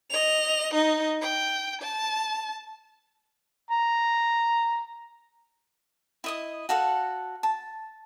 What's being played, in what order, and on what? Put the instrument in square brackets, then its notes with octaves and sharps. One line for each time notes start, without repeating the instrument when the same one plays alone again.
[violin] D#5 F7
D#4 D#5
G5
A5
[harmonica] A#5
[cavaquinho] E4 D#5 D#6
F#4 A4 F5 F#5
A5